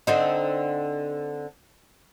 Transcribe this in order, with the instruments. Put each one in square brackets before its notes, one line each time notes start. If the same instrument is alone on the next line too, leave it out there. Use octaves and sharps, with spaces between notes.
[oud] D3 C4 D#4